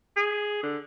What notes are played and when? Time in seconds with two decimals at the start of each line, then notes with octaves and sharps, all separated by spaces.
0.16 G#4
0.63 D3